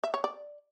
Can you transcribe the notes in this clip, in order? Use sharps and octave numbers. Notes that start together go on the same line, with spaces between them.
E5
C#5
D5